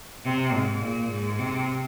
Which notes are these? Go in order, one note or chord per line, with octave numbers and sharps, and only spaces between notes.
C3
G#2
A#2
G#2
C3